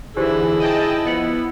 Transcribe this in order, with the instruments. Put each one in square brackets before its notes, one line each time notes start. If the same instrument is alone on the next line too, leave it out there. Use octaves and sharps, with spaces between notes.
[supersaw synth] D3 E3 [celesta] D#4 G4 C5 [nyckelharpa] E4 [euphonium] G#4
[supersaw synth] D#5 G5 A5
[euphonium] F3 [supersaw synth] B3 [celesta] D#5 C#7 F#7